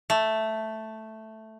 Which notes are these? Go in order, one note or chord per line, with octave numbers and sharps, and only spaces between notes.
A3